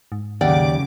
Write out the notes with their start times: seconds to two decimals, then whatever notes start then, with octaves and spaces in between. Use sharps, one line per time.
0.12 G#2
0.41 D#2 C#3 F#3 D5 F#5 G5 D6